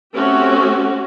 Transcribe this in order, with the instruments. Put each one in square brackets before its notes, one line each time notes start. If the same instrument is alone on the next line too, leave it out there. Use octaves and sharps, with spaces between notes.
[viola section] A3 C4 C#4 F#4 G4